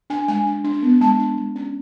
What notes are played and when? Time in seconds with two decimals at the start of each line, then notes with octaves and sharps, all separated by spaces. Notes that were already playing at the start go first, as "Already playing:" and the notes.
0.10 D4 G#5
0.28 G#3 G#5
0.46 D4
0.64 D4
0.83 B3
1.01 G#3 A5
1.19 D4
1.37 G#3
1.56 C#4